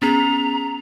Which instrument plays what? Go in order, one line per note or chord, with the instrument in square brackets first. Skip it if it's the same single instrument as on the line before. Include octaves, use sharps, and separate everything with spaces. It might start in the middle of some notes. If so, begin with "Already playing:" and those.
[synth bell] B3 C#4 G#4 [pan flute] A#5